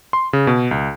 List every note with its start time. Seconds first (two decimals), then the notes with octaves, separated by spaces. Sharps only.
0.13 C6
0.33 C#3
0.47 B2
0.71 C#2